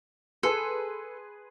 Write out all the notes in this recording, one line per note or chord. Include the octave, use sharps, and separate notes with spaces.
G#4 A4 B4 C6